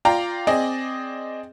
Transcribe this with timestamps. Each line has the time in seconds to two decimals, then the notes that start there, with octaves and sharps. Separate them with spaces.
0.05 F4 D5 G5 A#5
0.47 C4 G#4 D5 D#5